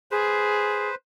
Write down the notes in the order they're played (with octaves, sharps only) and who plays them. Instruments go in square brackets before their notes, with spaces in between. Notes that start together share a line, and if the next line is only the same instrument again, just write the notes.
[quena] G#4 [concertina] B4 C5